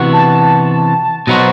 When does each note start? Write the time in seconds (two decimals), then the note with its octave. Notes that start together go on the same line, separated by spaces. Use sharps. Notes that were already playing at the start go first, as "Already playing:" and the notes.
Already playing: C3 E3 B3 F#4
0.13 A5
1.27 B2 F#3 B3 D#4 F#4 C5